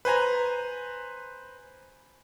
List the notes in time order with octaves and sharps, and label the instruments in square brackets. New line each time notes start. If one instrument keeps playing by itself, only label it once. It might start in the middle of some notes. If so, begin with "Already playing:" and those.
[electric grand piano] B4 C5 G#5 A#5